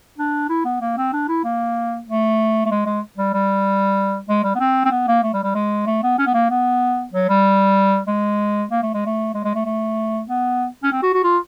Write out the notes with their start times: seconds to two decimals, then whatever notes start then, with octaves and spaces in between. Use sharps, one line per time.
0.18 D4
0.49 E4
0.65 B3
0.81 A#3
0.97 C4
1.13 D4
1.28 E4
1.44 A#3
2.07 A3
2.66 A3
2.71 G#3
2.86 G#3
3.17 G3
3.34 G3
4.29 G#3
4.44 G3
4.55 B3
4.60 C4
4.85 C4
4.91 B3
5.08 A#3
5.23 A3
5.34 G3
5.44 G3
5.55 G#3
5.86 A3
6.03 B3
6.18 C#4
6.26 B3
6.34 A#3
6.50 B3
7.13 F#3
7.29 G3
8.08 G#3
8.71 A#3
8.82 A3
8.94 G#3
9.06 A3
9.34 G#3
9.45 G#3
9.55 A3
9.65 A3
10.28 B3
10.83 C#4
10.92 C4
11.03 F#4
11.14 F#4
11.24 F4